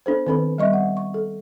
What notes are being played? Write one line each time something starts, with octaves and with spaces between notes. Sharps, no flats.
B3 D4 A4 C5
D#3 B3 C4 A4 B4 B5
G3 B3 D#5 E5 C#6
F#5
C#6
A4